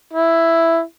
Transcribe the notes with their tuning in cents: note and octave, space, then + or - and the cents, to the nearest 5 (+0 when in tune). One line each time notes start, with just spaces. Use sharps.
E4 +5